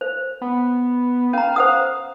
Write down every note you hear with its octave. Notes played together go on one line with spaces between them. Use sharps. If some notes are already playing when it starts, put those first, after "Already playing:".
C5
B3
C#4 F5 A#5
C5 F#5 D#6